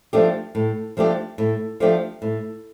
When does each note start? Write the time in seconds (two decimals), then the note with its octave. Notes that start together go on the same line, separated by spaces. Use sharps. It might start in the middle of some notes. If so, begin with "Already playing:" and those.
0.13 F3 A3 D4 G4
0.55 A2
0.97 F3 A3 D4 G4
1.38 A2
1.80 F3 A3 D4 G4
2.22 A2